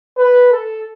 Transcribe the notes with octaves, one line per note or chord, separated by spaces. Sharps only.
B4
A4